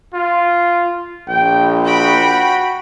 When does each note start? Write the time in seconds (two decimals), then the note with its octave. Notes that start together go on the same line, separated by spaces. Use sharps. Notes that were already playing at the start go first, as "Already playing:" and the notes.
0.14 F4
1.28 A#1 G5
1.85 F#4 G5 B5